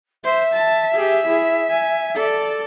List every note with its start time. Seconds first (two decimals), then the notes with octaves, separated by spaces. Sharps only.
0.24 C5 E5
0.53 A5
0.94 G4 G#4
1.26 E4 G#4
1.70 G#5
2.15 A4 D5